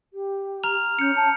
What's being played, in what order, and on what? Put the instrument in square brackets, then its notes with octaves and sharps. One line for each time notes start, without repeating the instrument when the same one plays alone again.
[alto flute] G4
[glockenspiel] A#5 F6 F7
[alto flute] C#4 [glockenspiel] G6 C#7
[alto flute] A5